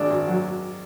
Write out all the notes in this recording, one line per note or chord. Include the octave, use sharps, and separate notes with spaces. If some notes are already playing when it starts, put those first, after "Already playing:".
Already playing: G#1 G#3 D4
G#1
F#3